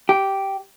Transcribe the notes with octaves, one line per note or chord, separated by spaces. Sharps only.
G4